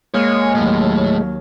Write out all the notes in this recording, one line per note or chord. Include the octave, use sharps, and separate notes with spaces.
G#3 A#3 C#5 F6
D#2 A2 F#3